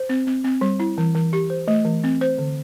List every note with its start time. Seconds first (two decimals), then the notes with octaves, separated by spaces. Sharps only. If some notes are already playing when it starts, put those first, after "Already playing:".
Already playing: C5
0.09 C4
0.27 C4
0.44 C4
0.61 G3
0.80 E4
0.98 E3
1.15 E3
1.33 G4
1.50 C5
1.68 A3
1.85 E3
2.04 C4
2.21 C5
2.38 D3